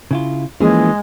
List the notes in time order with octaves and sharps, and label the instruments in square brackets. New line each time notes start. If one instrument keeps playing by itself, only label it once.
[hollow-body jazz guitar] C#3 E4 F4
[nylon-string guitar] E3 G#4 [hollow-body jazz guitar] F3 [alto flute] G#3 [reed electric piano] A#3 C#4